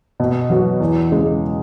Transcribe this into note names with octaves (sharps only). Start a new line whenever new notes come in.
B2
F#3 B3 F#4
E2
C#3 G#3